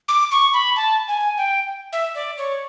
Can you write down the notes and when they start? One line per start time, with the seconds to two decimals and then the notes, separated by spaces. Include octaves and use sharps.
0.08 D6
0.31 C#6
0.53 B5
0.76 A5
1.08 G#5
1.38 G5
1.92 E5
2.15 D5
2.38 C#5